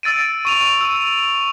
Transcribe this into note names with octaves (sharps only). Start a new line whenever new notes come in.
E6 A6 D7 D#7
C#6 D#7 F7
E6